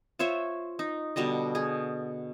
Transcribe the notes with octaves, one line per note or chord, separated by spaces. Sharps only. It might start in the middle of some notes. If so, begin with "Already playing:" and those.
F4 C5 C#5 E5
D#4
B2 D3 G3 D#5
G#4